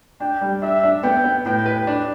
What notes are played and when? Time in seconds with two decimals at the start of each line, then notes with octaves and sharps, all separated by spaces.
0.20 D4 G5
0.41 G3
0.62 D4 E5
0.83 D4
1.03 B3 G5
1.24 B3
1.46 A2 G5
1.66 B4
1.87 D4